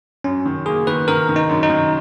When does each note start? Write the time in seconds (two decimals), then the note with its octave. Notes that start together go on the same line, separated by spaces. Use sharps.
0.24 F#2 C#4
0.46 D#3
0.66 A#3 G#4
0.87 D#3 B4
1.08 D#3 A#4
1.29 D#3
1.36 D#4
1.49 F#2
1.63 D#4
1.70 D#3